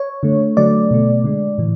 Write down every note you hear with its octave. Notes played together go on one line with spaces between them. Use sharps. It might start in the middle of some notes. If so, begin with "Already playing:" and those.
Already playing: C#5
D3 A3
D3 F#3 A3 D5
B2 A3
D3 G#3
A2 E3